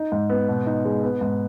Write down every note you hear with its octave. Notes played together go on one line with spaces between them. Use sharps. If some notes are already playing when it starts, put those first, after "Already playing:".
Already playing: D#4
G#2
B3
B2
D#4
G#3
B3
G#2